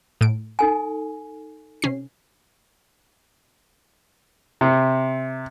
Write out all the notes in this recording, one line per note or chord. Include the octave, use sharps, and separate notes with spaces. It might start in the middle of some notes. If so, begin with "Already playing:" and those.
A2 D7
D#4 A4 G#5
C3 C#4 C7
C3